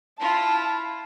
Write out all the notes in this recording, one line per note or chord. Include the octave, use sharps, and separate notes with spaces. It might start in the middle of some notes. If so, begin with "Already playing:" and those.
E4 F4 A5